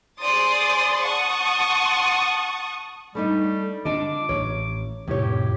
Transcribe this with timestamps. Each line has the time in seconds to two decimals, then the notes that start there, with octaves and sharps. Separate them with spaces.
0.19 G#4 C5 D5 C6 D#6 A6
1.03 F#5 A5 C#6 D#6
3.15 G3 A3 D4 D#4
3.85 D3 D4 F4 D#5 D6
4.29 A1 C#5
5.08 F2 A2 C3 F3 G4 C#5